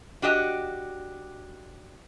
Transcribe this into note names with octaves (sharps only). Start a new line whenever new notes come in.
D4 F#4 G4 D#5